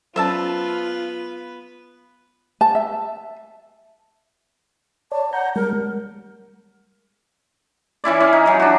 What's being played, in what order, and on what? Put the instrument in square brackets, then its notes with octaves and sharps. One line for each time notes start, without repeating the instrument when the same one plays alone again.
[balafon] F#3 C#4 [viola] B3 B4 [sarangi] F4 [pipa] C5 E5 A5
[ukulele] A5
E5
[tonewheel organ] C#5 D5 [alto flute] A5
[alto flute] F#5 [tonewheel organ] A#5 G6
[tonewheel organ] G3 G#3 [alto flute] A#4
[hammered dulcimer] E3 C#4 E4 D5
C#4 F5
D#4
E3 F#3
D4 F#4